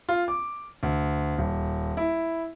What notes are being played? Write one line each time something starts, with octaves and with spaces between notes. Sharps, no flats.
F4
D6
D2
D#1
E4